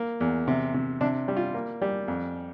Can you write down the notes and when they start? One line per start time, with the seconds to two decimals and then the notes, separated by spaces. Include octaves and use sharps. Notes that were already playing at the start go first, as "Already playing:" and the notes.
Already playing: A#3
0.20 E2
0.48 C3
0.74 C3
1.01 C3 D4
1.28 G3
1.37 F4
1.54 A#3
1.82 G3
2.08 F2